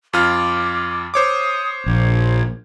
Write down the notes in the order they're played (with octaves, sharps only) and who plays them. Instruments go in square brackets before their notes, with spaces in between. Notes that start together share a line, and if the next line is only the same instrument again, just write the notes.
[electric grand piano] F2 F4 F6 [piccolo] D6
[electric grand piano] C5 C#5 D6 [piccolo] D#6
[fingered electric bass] A#1 [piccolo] G#6